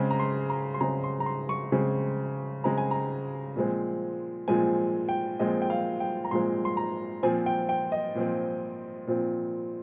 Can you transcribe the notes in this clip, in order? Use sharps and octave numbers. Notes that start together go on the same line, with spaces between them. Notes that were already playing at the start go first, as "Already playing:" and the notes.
Already playing: C#3 G#3 C4
A#5
C6
A#5
C6
C#3 G#3 C4 A#5
C6
A#5
C6
C#6
C#3 G#3 C4
C#3 G#3 C4 A#5
G#5
A#5
A#2 F3 G#3 C4
A#2 F3 G#3 C4 G#5
G5
A#2 F3 G#3 C4 D#5
G5
F5
G5
A#5
A#2 F3 G#3 C4 C6
C6
A#5
A#2 F3 C4 G#5
G5
G5
D#5
A#2 F3 C4
A#2 F3 C4